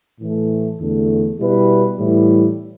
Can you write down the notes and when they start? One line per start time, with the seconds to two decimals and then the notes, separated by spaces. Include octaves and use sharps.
0.20 A2 E3 A3
0.80 E2 D3 A3
1.39 B2 G3 E4 B4
1.98 A2 E3 G3 E4